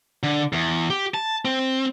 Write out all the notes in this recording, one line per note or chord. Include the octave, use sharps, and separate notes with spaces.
D3
E2
G4
A5
C4